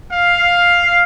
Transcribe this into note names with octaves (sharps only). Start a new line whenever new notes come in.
F5